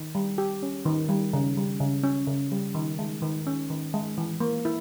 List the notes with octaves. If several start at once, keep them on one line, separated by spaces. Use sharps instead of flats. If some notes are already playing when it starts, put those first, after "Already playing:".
Already playing: D#3
G3
G4
C#4
D#3
G3
C#3
G3
C#3
C#4
C#3
G3
D#3
G#3
D#3
C#4
D#3
G#3
E3
A#3
E4